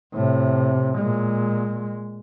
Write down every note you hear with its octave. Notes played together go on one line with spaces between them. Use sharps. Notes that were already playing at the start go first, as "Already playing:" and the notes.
A2 C3
A#2 G#3